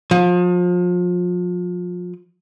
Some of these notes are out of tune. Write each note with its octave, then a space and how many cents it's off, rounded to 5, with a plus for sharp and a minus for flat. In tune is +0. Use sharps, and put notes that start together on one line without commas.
F3 +30